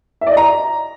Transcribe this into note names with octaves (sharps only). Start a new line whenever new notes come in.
E5
D5
D#5
A#5